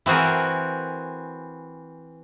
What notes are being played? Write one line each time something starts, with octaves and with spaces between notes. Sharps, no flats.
E3 C4 F#4 G#4 A#4